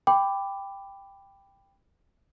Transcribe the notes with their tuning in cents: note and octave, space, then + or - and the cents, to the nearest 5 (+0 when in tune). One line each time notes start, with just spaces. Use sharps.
G5 +10 B5 +15 D6 +0